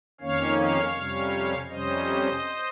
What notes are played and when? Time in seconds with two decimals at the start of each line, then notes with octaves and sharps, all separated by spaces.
0.21 F2 D#3 A#3 C#4 C#5 F5
0.58 C#5 F5
0.95 F2 C3 G3 C#4
1.69 F2 C3 G3 C#4 C5 D#5